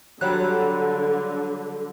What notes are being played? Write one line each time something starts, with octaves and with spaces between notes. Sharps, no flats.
D3 F#3 G3 A4 C#5 F#6